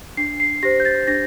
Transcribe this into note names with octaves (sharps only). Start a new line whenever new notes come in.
D4 C7
C7
G4 C5 A#6
G6
A6
D4 A#6